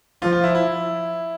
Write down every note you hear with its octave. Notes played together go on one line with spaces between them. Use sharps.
F3 F4
F4
E4
E4